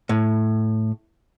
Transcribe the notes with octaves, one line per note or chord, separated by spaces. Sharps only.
A2